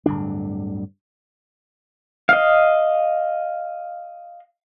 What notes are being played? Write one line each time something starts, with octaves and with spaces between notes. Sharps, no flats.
D1 G2 D3 D4
D#5 F5